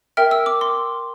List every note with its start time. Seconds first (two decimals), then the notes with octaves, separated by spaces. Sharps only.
0.17 A#4 E5 G5 F6
0.31 E6
0.46 D6
0.61 C6